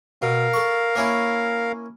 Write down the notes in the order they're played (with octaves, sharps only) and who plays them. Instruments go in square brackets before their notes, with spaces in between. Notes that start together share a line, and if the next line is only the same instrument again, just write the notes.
[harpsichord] B2 [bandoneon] A#4 F5
[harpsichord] A4 C#6
A#3 C#4 E4